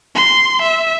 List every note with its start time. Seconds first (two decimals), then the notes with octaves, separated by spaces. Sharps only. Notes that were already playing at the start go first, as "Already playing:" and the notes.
0.15 C6
0.63 E5